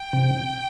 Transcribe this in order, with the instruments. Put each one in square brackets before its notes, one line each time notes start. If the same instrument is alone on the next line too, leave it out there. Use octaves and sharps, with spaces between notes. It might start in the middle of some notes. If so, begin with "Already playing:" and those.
Already playing: [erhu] G5
[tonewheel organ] C3